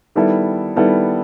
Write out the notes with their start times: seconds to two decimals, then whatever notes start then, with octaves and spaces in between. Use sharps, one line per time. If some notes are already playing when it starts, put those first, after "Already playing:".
0.15 D#3 G3 B3 E4 A4
0.76 D#3 G3 B3 E4 A4